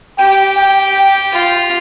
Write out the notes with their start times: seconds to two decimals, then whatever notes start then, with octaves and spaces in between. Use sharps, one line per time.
0.19 G4 G5
0.57 G5
0.94 G5
1.33 F4